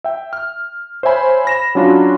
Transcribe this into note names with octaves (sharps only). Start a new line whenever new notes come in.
E5 G5
F6
C5 C#5 E5 G#5 B5
B5 A#6 E7
F#3 C#4 D4 F4 F#4 B5